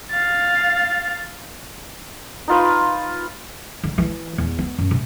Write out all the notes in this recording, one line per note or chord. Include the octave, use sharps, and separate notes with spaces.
F5 A6
D#4 F4 B4
D3
E3
E2
B3
F#2
C3